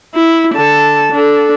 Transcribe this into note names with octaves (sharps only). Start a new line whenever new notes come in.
E4
D3 A5
D4 A4